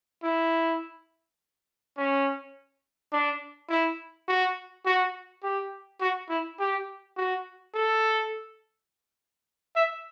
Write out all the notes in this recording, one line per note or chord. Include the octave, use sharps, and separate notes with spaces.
E4
C#4
D4
E4
F#4
F#4
G4
F#4
E4
G4
F#4
A4
E5